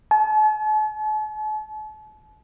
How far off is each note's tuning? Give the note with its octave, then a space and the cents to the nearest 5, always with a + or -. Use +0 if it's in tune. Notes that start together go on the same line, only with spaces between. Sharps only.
A5 -45